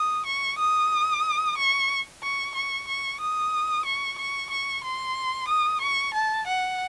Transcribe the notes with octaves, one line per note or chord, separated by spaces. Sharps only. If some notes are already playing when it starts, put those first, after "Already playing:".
Already playing: D#6
C#6
D#6
C#6
C#6
C#6
C#6
D#6
C#6
C#6
C#6
C6
D#6
C#6
A5
F#5